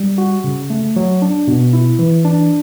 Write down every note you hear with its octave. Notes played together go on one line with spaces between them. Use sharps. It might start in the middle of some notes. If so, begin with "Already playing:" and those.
Already playing: G3
F#4
C#3
A3
F#3
D4
B2
E4
E3
D4